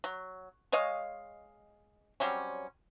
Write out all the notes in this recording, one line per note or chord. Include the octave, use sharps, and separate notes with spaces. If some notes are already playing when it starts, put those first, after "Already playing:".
F#3
G#3 C#5 D#5 F5
F#3 G3 C4 C#4